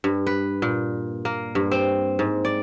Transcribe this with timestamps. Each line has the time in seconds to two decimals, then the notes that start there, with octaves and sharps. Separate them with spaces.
0.04 G2
0.27 B4
0.62 A#2
1.25 A#3
1.55 G2
1.71 C4
2.19 G#2
2.45 D5